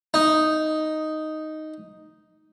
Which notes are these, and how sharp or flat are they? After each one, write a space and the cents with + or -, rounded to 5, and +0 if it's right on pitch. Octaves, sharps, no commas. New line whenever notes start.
D#4 +0